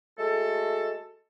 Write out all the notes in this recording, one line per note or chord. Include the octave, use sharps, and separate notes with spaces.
G#3 A3 F#4 A4